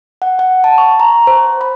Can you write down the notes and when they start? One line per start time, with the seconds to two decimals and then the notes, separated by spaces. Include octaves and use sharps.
0.22 F#5
0.39 F#5
0.64 A5
0.78 C#6
1.00 A#5
1.27 C5
1.61 B5